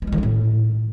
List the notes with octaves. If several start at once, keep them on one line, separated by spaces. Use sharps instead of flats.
B3
G#3
D#3
C#4
A2